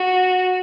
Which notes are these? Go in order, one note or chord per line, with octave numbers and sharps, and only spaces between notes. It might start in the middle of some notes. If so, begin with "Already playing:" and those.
Already playing: F#4